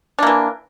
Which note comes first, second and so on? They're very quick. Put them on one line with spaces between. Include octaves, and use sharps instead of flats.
D4 A#3 E3